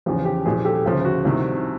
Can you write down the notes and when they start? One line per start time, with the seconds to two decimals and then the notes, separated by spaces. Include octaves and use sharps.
0.06 E2 C#3 F3 G4
0.25 G4
0.45 C2 A#2 F3 F#4 G#4
0.65 G4 A4
0.86 D2 C#3 F3
1.05 F#4
1.25 C2 C3 D#3